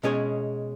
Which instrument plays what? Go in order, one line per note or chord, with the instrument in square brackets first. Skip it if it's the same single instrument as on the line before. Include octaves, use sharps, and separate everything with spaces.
[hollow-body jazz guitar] B2 G#3 C#4 G#4 C#5